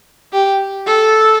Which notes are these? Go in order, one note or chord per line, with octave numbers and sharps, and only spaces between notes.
G4
A4